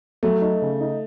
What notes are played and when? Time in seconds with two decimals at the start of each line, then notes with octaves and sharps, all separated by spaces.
0.23 F#3 A3
0.42 D#4
0.62 C#3
0.81 D#4